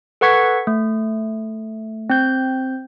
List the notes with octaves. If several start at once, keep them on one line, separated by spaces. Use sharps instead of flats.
A4 B4 F#5 C#6 G#6 B6
A3
C4 G6